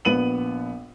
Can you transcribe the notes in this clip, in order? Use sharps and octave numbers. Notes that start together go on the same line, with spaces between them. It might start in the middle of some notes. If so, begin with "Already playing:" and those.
A#1 B3 D#7 F#7